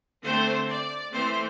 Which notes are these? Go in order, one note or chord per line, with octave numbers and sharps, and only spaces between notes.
D3 A3 C4 C5
D5
E3 A3 C4 C5